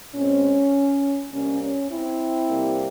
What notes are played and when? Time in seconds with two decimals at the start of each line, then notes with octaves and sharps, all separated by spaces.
0.13 A#2 G#3 C4 C#4
1.31 C3 G3 A#3 C#4
1.60 C#4
1.90 C4 E4
2.48 C3 G3 A#3